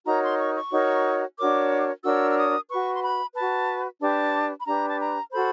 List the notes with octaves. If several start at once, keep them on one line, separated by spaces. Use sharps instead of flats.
D#4 F#4 A#4 C#5 A#5
C6
C#6
C#6
D#4 F#4 A#4 C#5
D4 F#4 A#4 C#5 D6
D4 F#4 A#4 C#5 E6
E6
D#6
F#4 B4 C#6
C6
B5
F#4 B4 A5
D4 G4 B4 A5
B5
D4 G4 B4 A#5
A5
A#5
F#4 A4 C5 B5